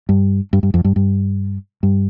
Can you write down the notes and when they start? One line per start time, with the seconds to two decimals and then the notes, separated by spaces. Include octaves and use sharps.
0.09 G2
0.53 G2
0.63 G2
0.74 F2
0.84 G2
0.96 G2
1.83 G2